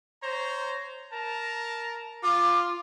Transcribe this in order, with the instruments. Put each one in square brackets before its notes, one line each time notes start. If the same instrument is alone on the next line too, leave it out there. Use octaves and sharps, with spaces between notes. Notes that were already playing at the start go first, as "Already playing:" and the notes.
[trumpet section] C5 C#5 A#5
A#4 A5 A#5
[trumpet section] F4 [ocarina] D6